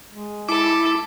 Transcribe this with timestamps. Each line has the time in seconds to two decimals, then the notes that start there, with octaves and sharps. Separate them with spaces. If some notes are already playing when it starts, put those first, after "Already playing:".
0.12 G#3
0.49 E4 A4 A5 D6